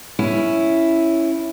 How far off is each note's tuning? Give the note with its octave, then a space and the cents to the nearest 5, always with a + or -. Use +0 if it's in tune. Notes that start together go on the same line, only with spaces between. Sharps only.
C#4 +0 E4 +0